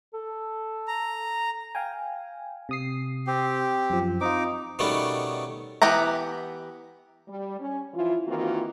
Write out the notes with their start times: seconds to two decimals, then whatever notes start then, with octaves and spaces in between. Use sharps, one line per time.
0.14 A4
0.88 A#5
1.75 F5 G5 G#5
2.69 C3 D#6 C7
3.27 C4 G4
3.90 F#2 F3
4.21 C4 D#4 F4 D6
4.79 B2 D#3 G3 A3 B3 C#4
5.82 E3 B3 G4 F#5 A#5
7.28 G3
7.59 C#4
7.94 E3 F3 E4 F4
8.27 D#3 E3 A#3 C4 F4 F#4